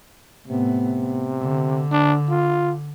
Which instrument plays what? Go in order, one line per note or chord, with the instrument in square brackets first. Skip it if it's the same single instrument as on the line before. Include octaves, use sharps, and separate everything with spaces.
[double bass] A2 B3 [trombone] C3
[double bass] D3
[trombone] D4
F4